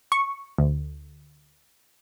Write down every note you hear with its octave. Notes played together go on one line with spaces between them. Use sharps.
C#6
D2